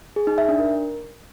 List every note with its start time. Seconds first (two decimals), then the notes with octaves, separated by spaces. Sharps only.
0.16 G#4
0.27 D#4
0.38 E5
0.49 D4
0.59 A#4